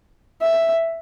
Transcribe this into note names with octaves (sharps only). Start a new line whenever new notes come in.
E5